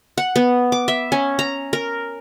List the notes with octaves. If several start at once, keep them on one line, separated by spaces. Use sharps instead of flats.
F#5
B3
D6
E5
C#4
A#5
A#4